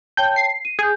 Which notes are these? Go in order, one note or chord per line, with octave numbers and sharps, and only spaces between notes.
C#5 G5 A5 G6
C7
D#7
G#4 G#5 G6